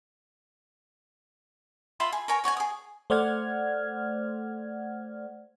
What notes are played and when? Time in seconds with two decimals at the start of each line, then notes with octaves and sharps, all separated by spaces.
2.00 F4 E5 B5 C6
2.12 G#4
2.28 A#4 C#5 G#5 A#5
2.44 F#4 C#5 G5 G#5
2.57 G#4 D#6
3.10 A3 C5 D5 F#5 F6 G#6